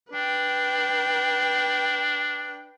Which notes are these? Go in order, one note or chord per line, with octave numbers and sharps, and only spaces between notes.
D4 B4 G5